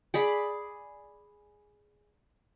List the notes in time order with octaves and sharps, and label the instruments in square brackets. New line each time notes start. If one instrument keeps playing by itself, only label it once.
[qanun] G#4 D5 B5